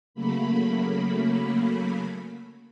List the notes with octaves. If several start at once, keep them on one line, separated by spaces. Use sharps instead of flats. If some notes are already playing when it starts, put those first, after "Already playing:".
C#3 F#3 A3 A#3 B5